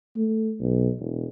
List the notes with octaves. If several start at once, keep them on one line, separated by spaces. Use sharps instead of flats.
A3
B1
E1